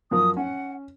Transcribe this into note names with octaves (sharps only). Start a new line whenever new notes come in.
F#2 F3 A#4 D#6
C#4 F#5